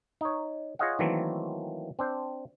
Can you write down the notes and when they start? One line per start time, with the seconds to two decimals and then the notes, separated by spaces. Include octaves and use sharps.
0.21 D#4 C#5
0.79 F4 G#4 C#5 D#5 F5 F#5
0.99 D#3 E3 F#3 A3 A#3 C4
1.99 C4 D4 C5